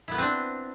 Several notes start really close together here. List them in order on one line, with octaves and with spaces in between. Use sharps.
E4 B3 B4 C4 D4